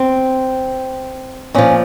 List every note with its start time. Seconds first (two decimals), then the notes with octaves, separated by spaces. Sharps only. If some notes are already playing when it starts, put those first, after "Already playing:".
Already playing: C4
1.54 A#2 F3 C#4